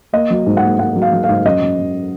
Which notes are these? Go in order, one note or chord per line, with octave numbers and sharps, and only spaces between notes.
A#3 D#5
F#3
G#2
F#5
A#3
G#2 F#5
F#3
F5
F#3
G#2 F5
F#2 D#5
F#2
F#2